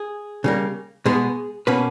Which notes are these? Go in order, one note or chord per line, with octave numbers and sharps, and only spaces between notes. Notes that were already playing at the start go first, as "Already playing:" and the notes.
Already playing: G#4
C#3 G3 A#3
B2 G#3 B3 G#4
B2 A#3 C#4 B4